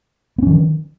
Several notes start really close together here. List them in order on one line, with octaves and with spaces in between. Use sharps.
B3 C#4 F3 D#3